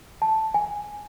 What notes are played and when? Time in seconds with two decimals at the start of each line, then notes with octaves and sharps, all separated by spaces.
0.22 A5
0.54 G#5